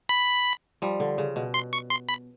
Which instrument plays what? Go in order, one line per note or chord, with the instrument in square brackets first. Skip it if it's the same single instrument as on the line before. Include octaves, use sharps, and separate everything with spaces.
[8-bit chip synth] B5
[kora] F3 G3
D3
C#3
B2
[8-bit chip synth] C6
C#6
C6
B5